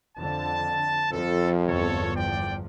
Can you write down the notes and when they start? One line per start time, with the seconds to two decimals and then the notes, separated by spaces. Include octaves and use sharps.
0.18 F2 D3 A5
1.12 F2 F3 A4
1.68 G1 E2 F3 A4 C#5
2.16 D5 G5